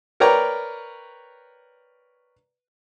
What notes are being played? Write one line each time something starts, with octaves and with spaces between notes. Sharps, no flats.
A#4 B4 C#5 D5 G5 A#5